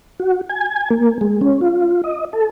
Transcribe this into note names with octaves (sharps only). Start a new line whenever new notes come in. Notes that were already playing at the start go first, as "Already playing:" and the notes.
F#4
G#5
A#3
G#3
C#4
F4
D#5
A4